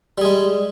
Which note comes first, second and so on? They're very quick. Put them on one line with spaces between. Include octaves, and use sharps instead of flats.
G3 G#4 G#3